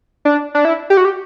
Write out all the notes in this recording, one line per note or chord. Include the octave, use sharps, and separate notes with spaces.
D4
D4
E4
G4
F#4
G4